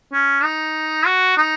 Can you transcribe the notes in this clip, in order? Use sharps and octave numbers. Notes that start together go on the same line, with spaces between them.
C#4
D#4
F#4
D#4